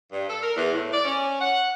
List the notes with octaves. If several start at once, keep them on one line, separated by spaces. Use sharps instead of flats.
G2
A4
A#4
E2
A2
D5
C#4
F#5